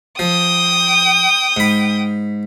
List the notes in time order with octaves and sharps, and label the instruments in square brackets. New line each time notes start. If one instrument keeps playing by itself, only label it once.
[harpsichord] F3 [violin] G5 D#6
[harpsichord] G#2 B5